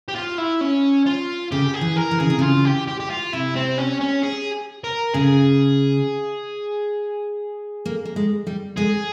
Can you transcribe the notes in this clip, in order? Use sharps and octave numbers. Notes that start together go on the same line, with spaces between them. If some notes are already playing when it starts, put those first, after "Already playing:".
G4
F4
E4
C#4
F4
C#3 G4
G#4
E3
A#4
E3
C#3 G#4
C3
C#3 F4
G4
G4
G4
F4
C3 E4
C4
C#4
C#4
G#4
A#4
C#3 G#4
A#3
A#3
G#3
G3
G#3 G#4